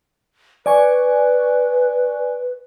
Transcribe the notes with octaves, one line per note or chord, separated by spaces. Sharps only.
B4 D5 G#5 C#6